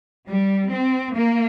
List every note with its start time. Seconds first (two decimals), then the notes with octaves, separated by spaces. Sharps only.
0.27 G3
0.70 C4
1.13 A#3